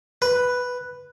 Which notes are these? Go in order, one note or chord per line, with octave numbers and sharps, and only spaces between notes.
B4